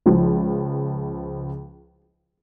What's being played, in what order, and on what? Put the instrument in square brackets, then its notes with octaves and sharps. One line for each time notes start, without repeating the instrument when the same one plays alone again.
[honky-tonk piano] C#2 F3